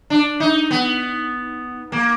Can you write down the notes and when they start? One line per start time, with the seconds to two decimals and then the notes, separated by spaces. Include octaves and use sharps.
0.10 D4
0.40 D#4
0.71 B3
1.92 A#3